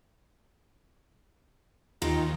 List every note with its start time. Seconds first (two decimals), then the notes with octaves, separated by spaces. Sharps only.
2.02 D#2 D#4 F4 G4